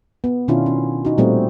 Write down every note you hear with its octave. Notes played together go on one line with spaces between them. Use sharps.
B3
B2 D#3 C#4 D4 E4 F4
C#4
D#4 F#4
A#2 G3 A3 C4 F#4